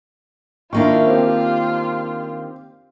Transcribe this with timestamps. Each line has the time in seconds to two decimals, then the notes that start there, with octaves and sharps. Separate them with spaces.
0.73 D#3 A#3 D4 E4 F4 C#6
1.07 C4 G4